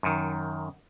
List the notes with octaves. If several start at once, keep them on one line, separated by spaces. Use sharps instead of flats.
F#2 D#3